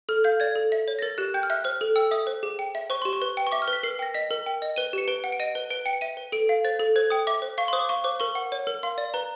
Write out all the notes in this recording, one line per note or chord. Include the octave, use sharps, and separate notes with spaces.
A4 F6
F5 G6
D5 G#6
A4
E5
C#5
A#6
A#4 A6
G4 F#6
G5 G6
F6
E5 F#6
C5 F6
A4
G5 E6
E5 D#6
C5
G#4
G5
E5
C5 C#6
G4 C6
C#6
B4
G5
C#6
E5 D6
F6
B4
B6
A#4 C7
G5 A#6
D#5 B6
A#4
G5
D#5
B4 D#7
G4 C#7
B4 D7
F#5
D7
D#5 D#7
B4
B4 D7
G5 C#7
E5 D#7
B4
A4 D7
F5
C5 A6
A4
C5 G#6
G5 D#6
E5 D6
C5
F5 C#6
C5 C6 D#6
D6
F5 C#6
C5 D6
A#4 C#6
F#5
C#5
A#4
F5 C6
D5
B4 A#5